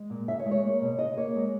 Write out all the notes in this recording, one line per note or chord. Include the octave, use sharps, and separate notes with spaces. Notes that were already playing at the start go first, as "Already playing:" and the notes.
Already playing: G#3
A#2
C#3 E5
C#5
G#3
C#5
A#3
B2
C#3 D#5
A#3 C#5
G#3